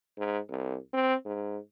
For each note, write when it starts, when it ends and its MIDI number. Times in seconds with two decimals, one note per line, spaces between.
0.18 0.39 44
0.49 0.77 36
0.93 1.15 60
1.25 1.58 44